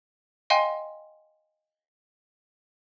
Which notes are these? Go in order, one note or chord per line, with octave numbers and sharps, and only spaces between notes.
D#5 F5 G5 G#5 C6